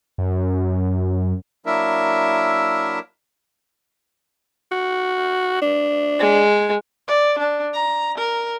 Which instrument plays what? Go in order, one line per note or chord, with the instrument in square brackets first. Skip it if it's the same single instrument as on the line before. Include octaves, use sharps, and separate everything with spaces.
[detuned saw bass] F#2
[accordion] F#3 A#3 D4 E4 A#4 E5
[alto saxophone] F#4
D4
[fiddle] G#3
[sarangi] D5
D4
A#5
A#4